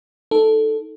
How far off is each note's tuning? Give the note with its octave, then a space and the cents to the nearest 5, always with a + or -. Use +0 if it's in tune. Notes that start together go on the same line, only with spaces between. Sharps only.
D#4 +5 A4 +0